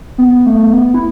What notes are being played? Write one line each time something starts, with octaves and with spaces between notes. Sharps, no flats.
B3
A3
B3
E4